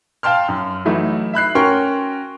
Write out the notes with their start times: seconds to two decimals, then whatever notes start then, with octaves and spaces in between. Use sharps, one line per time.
0.23 F5 G5 A5 C6 F6
0.48 F#2
0.85 E3 F#3 A3 D#4 E4
1.33 E5 B5 F#6 C7
1.55 C#4 F#4 A#4 G5 C6 C#6